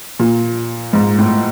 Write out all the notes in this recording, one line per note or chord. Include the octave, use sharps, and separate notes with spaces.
A#2
G#2
A2